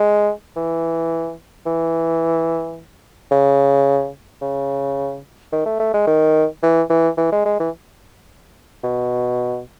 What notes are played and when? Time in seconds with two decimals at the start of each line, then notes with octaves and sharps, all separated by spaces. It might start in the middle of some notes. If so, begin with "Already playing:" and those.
Already playing: G#3
0.56 E3
1.66 E3
3.32 C#3
4.42 C#3
5.52 D#3
5.66 A3
5.80 A3
5.94 G#3
6.07 D#3
6.63 E3
6.90 E3
7.18 E3
7.32 G#3
7.45 G#3
7.60 E3
8.84 B2